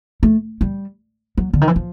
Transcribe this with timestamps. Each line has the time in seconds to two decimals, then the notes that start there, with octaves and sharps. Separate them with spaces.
0.23 A3
0.61 G3
1.38 F#3
1.53 D3
1.61 D#3
1.68 E3
1.76 F3